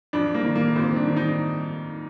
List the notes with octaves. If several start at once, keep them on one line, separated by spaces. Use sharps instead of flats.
F2 D4
A#3
D#3
A#3
F2 C4
D4
D#3
D#4